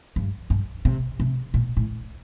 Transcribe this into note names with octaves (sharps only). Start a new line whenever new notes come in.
G2
G2
C3
C3
A#2
A2